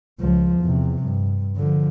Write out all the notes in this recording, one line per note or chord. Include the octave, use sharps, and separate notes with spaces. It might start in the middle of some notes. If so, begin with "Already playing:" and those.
C#2 F3
E2 C3
G2
D3 F3